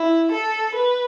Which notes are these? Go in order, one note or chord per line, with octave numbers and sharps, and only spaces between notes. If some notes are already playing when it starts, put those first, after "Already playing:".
Already playing: E4
A4
B4